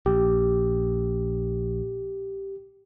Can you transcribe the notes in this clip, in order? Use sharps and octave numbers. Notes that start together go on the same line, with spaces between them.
A#1 G4